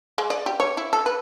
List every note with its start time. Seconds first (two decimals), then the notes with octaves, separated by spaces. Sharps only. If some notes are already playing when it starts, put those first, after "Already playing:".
0.18 G#3
0.30 D5
0.46 G4
0.60 C#5
0.77 E4
0.93 A4
1.06 B4